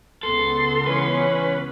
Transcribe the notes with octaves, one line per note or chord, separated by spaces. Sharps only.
C#2 C#3 B3 A4 C6
E3 C#4 B4